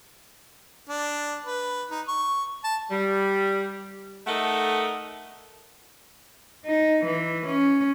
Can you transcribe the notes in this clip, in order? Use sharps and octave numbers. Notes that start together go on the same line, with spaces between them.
D4
B4
D#4
C#6
A5
G3
A3 D#4 A4 A#4 F#5
D#4
E3
C#4